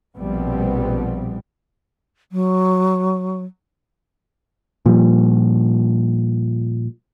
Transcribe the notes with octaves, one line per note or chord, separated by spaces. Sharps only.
A#1 B2 F3 G3 B3 C4
F#3
A#2 F3 G3